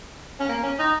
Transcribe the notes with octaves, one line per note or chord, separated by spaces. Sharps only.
C#4
A#3
C#4
D#4